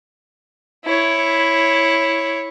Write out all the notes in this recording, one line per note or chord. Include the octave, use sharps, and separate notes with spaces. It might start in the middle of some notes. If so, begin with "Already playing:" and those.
E4 C#5